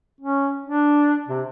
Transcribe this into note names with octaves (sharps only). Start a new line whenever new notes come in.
C#4
D4
C3